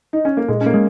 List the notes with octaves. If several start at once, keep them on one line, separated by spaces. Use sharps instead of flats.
D#4
C#4
A#3
A#2 G#3
C#4
A#3
G#3